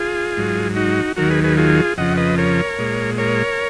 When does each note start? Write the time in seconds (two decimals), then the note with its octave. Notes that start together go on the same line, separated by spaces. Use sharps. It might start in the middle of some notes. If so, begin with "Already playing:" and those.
Already playing: F4 G#4
0.37 G#2 F#3
0.76 D#4 F#4
1.16 D#2 D#3 F#3 F#4 A#4
1.30 G#4 B4
1.44 G#4 B4
1.57 F4 G#4
1.97 F2 C#3 F3 D#5 F#5
2.17 B4 D#5
2.38 A#4 C#5
2.78 A#2 G#3
3.18 A#4 C#5